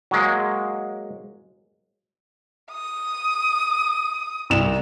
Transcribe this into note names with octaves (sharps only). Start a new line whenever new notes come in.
F#3 G#3 A#3
D#6
C2 E7